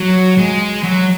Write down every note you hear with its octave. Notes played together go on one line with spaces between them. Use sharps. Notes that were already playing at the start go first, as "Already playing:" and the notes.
Already playing: F#3
G#3
F#3